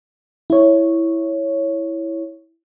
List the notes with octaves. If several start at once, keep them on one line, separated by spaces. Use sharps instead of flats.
E4 C#5